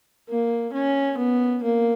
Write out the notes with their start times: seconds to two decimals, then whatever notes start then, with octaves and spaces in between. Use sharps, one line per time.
0.29 A#3
0.73 C#4
1.18 B3
1.62 A#3